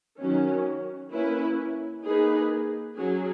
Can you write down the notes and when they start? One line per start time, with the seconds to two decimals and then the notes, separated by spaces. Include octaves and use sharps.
0.20 D#3 F#3 C#4
1.12 A#3 C#4 E4 B4
2.04 A#3 D#4 G#4 B4
2.96 F#3 C#4 G#4